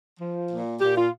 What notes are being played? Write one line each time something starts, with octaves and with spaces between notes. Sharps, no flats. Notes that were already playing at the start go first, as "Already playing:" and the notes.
F3
A#2
A#2 G4
F4